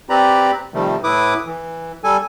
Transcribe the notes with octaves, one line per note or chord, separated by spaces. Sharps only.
C4 G4 B4 D5 A#5 B5
C3 D#3 F3 G3 A3
A2 E4 B4 D6 D#6
E3
G3 A4 G#5